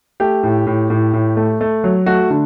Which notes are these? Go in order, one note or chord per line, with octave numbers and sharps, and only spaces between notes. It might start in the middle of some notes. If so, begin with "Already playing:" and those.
A3 G4
A2
A2
A2
A2
A3
A3
F#3
A3 F#4
D3